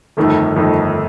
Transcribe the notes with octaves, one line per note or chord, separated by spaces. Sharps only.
G1 F2 D#3 A3 D#4
G1 F2 D#3 A3 D#4